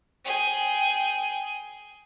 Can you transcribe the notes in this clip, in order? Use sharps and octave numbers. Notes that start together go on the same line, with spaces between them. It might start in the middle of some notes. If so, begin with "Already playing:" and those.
G#4 G5